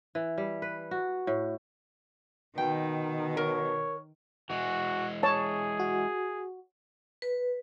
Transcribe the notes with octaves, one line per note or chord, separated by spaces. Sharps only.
E3
G3
B4
F#4
A2
B2 D#3 G5
A#4 C#5
E3 G#3 F#4
G#4 C#5 A5
F#4
B4